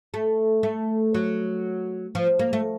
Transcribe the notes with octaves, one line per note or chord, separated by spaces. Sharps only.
A3
A3
F#3
F3
A#3
A3